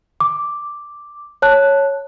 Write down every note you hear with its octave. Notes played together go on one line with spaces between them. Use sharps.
D6
C#5 A5 F#6